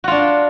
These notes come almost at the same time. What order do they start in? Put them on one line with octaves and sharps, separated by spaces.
F#4 F4 D4